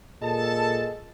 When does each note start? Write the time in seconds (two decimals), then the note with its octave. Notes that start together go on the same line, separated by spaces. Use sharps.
0.22 A#2 G#3 A4 A5